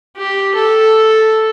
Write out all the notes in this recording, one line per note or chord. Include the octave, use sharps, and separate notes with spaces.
G4
A4